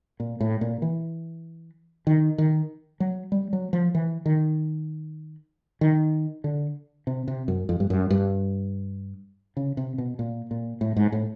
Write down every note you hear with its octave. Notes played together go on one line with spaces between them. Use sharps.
A#2
A2
A#2
E3
D#3
D#3
F#3
G3
F#3
F3
E3
D#3
D#3
D3
C3
C3
F#2
F2
G2
F#2
G2
C#3
C3
B2
A#2
A#2
A2
G#2
A2